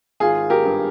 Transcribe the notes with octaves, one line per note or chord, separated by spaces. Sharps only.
G#1 F4 G#4
G4 A#4
G2